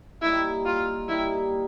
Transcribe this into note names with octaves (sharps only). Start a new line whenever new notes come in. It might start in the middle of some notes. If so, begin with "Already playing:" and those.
G3 A#3 D#4 E4
F4
G3 A#3 D#4 E4